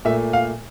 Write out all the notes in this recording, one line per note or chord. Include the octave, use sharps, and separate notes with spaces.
A#2 A3 E5
F5